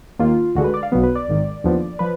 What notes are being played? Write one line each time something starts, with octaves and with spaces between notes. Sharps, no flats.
D#2 D#3 A#3 F4
D2 D3 G#3 F#4
B4
D5
F5
B1 B2 F#3 B3
B4
D5
G#1 G#2 D#3
D#2 D3 F3 B3
F3 B4